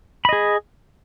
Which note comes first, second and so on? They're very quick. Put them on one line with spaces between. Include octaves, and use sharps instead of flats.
B5 D#5 G#4